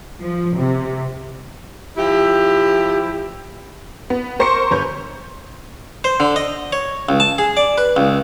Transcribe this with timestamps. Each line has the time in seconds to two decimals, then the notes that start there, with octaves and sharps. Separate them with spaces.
0.23 F3
0.58 C3
1.97 F3 E4 G4
4.10 B3
4.39 A#4 C5 C6 C#6 C#7
4.71 G1 B4 C#5 G6
6.04 C5
6.20 D3
6.36 D#5
6.73 C#5
7.09 C#2
7.20 A5
7.38 G#4
7.57 D5
7.78 B4
7.96 C#2